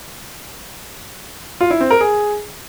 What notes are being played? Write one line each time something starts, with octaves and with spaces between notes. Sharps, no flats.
F4
E4
C4
A#4
G#4